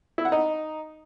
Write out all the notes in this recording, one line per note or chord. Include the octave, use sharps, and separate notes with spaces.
E4
F#5
D#4